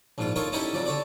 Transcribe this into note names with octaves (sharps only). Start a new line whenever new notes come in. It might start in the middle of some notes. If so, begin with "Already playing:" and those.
A#1 G#2 F4
D#4 F4 A4 A#4 C#5
C#4 D#4 E4 G4 A4 C#5
F2 F#3 D5
D3 C#5 D5